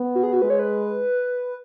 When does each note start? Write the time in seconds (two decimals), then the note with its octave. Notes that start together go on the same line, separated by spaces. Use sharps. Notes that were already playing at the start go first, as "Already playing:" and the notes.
Already playing: B3
0.15 F#4
0.23 G#4
0.33 F#4
0.42 G#3 B4
0.50 C#5
0.59 B4